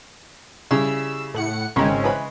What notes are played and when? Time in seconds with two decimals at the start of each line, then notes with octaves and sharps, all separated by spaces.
0.71 C#3 G3 E4 G#4 E6
1.34 A2 F#5 C#7
1.76 G#1 C#3 G#3 C4 C#4 A#4
2.04 E3 B4 B5